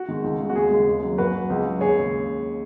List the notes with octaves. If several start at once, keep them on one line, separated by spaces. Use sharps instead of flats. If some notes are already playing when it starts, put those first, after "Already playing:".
Already playing: F#4
D#3 G#3
C#2
C#3 G#3
F#4
D#2 G#4
C#3 G#3
D#2
C#3 F#3
F#2 F#4 B4
F#3
C#2
C#3 F#3
D#2 G#4 C#5
C#3 G#3